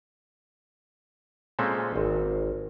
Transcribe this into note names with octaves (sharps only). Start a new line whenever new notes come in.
A#2 G#3 C4 C#4 A4
G#1